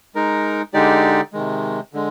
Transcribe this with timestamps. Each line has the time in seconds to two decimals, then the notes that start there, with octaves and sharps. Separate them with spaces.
0.15 G#3 D#4 A#4
0.74 D3 G#3 D#4 G4 D5
1.33 C3 D#3 G#3
1.93 D3 G#3